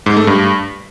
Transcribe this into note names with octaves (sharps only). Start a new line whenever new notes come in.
G#2
A3
G2